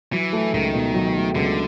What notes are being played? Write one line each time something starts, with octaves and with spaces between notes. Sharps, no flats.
E3 F#3
A3
C#2 D#3
B2
F#3
A3
C#2 D3